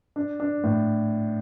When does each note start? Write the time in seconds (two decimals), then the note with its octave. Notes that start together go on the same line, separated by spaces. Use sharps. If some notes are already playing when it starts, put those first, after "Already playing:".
0.16 D4
0.40 D4
0.64 A2